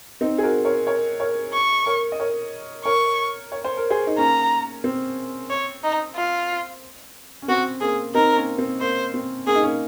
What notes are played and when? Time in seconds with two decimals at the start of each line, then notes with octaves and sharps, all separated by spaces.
0.21 C4 D#4
0.38 G#4
0.43 F#4 A#4
0.65 A#4 C#5
0.87 A#4 C#5
1.20 A#4 C#5
1.54 C#6
1.86 A#4 C#5
2.12 D#5
2.19 A#4 C#5
2.85 A#4 C#5 C#6
3.52 C#5
3.64 C5
3.77 A#4
3.90 G#4 C5
4.07 D#4
4.18 A#3 C#4 A#5
4.84 C4
5.50 C#5
5.84 D#4
6.15 F4
7.42 C#4
7.48 C4 F#4
7.81 A#3 C#4 G#4
8.14 C4 D#4 A#4
8.36 A#3 C#4
8.58 C4
8.81 A#3 C5
9.14 C4
9.47 A#3 C#4 G#4
9.55 D#4
9.63 A#3 C#4